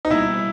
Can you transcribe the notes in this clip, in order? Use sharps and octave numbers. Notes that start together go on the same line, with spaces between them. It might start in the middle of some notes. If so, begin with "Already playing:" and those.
D#4
B2 G3 A#3 E4